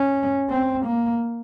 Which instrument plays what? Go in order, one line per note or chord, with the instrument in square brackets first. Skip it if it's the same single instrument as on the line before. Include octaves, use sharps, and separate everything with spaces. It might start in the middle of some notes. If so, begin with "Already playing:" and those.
Already playing: [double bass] C#4
C4
A#3